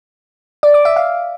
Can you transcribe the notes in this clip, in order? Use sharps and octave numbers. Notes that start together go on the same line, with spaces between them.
D5
D6
E5
F5